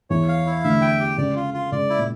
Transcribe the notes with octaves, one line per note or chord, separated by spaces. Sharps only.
E2 E3 C#5
F5
E4
D2 D3 E5
G5
G4
C#2 C#3 D5
F4
F4
C#2 C#3 D5
E4
A#2